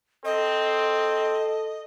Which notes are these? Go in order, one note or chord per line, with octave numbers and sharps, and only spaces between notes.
C4 A4 D#5